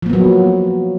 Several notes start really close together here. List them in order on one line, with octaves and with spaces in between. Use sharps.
F3 A#3 B3 F#3